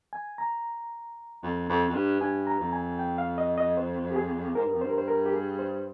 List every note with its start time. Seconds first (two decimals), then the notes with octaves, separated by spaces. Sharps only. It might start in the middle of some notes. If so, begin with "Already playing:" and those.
0.13 G#5
0.38 A#5
1.43 F2
1.69 F2
1.89 F2
1.95 G2
2.20 G2 G#5
2.47 A#5
2.60 F2
2.73 G#5
2.99 G5
3.18 F5
3.38 D#5
3.58 D#5
3.77 C5
4.11 G4
4.16 G#4
4.55 G#2 A#4
4.65 G2
4.73 F2
4.81 G2 C5
4.89 A#4
4.98 C5
5.08 A#4
5.26 G4
5.33 G#4
5.59 C5